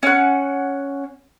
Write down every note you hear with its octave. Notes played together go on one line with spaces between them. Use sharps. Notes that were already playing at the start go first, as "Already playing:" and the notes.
C#4 F#5